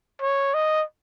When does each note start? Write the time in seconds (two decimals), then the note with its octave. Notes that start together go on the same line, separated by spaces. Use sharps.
0.22 C#5
0.54 D#5